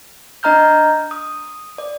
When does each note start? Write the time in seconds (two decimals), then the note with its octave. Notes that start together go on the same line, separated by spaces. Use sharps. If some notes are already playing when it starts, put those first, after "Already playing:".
0.43 D4 D#5 A#5 F6 G6
1.11 D#6
1.78 D5